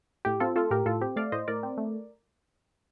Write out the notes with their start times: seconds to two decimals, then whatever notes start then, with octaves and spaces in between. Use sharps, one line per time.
0.25 A2 G4
0.40 C4 F4 A4
0.56 A3 F4 A4
0.71 A2 G4 A#4
0.86 A2 F4 A4
1.01 C4 G4
1.16 A3 D5 F5
1.32 A2 C5 D#5
1.48 A2 A#4 D5
1.63 C4
1.77 A3